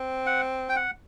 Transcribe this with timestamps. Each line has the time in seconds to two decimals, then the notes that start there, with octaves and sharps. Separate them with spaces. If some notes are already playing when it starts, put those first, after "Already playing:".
Already playing: C4
0.27 F#5
0.69 G5
0.76 F#5